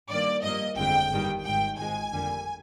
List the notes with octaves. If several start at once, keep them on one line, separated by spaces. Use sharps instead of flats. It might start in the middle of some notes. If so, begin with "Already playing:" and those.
G2 D#3 A#3 D5
G2 F3 A#3 D#5
G1 F2 D3 G#3 G5
G1 G2 D#3 G3 A#3
G#1 G#2 D#3 G5
G#1 G#2 F3 G#3 G#5
F2 D3 G3 A#3